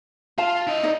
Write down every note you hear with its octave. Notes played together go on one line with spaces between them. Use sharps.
F4 F5 A5
E4 D#5
D#4 D5